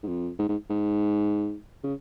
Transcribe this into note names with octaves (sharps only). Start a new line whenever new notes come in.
G#2
F2
G#2
G#2
G#2
C#3